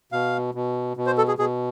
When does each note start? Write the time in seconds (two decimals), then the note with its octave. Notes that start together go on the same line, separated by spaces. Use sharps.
0.12 B2 F5
0.55 B2
0.97 B2
1.06 C5
1.18 A4
1.28 G#4
1.39 B2 G#4